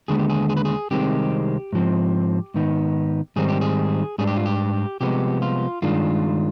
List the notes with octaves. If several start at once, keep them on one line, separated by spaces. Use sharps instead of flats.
D#2 D3 G#3 B3 G#4
G4
G#4
G#4
B4
G#4
C2 C3 D#3 G#3 C4 G4
G#2 F3 C4
G#2 D#3 B3 D#4
G#2 D#3 G3 C4 D#4 G#4
G4
G#4
G#2 G3 D4 G#4
G4
F4
G4
C2 C3 F3 G#3 B3 G4
F4
G2 D#3 G#3 D4 F4